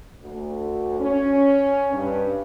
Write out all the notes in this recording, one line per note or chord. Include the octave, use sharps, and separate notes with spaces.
D2
C#4
G2